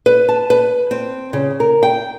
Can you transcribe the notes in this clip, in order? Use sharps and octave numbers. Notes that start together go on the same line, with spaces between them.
B4
A5
B4
C4
C#3
A#4
G5